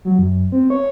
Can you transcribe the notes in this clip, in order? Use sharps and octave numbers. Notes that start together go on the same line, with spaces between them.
F#3
F#2
C4
C#5